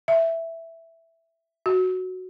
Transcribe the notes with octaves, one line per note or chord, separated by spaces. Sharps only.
E5
F#4